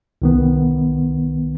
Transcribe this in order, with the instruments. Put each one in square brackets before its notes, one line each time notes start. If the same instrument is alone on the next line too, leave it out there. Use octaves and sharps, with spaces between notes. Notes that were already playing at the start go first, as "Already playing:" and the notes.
[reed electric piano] C2 D#3 B3